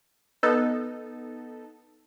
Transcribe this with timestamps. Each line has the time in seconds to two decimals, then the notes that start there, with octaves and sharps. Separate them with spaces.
0.43 B3 D#4 A4